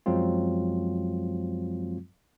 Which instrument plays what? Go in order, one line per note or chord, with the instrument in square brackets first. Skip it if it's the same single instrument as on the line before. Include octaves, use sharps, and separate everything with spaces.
[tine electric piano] F#2 F3 F#3 G#3 C4 F4